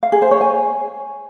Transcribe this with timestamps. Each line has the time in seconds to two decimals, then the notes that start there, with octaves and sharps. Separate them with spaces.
0.03 F5
0.12 G#4
0.22 C5
0.31 C#5
0.41 G#5